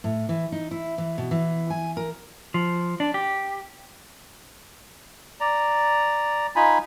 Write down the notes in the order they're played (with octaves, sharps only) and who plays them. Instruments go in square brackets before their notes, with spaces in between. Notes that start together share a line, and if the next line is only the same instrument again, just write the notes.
[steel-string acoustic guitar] A2
E3
D#4
E4
E3
B2
E3
G#5
A#4
[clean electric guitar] F3
D4
G4
[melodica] D5 A#5
D#4 F4 G#5 B5